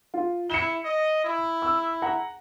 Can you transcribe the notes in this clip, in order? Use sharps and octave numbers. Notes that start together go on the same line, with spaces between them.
F4
E4 C#7 E7 G7
D#5
E4
E6
F#5 A#5